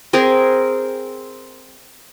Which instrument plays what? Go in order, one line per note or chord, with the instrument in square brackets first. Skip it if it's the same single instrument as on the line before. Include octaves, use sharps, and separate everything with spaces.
[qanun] C4 G#4 A#4